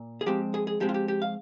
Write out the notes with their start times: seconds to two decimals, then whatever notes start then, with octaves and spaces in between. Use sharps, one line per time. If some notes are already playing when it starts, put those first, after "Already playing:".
Already playing: A#2
0.21 G#4
0.26 F3 G#3 C4 G4
0.54 G#4
0.67 G#4
0.80 F3 G#3 C4 G4
0.89 F4
0.94 G4
1.08 G4
1.22 F5